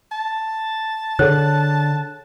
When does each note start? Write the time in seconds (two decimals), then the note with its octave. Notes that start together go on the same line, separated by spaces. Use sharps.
0.12 A5
1.19 D3 G#4 A4 C#5 F#6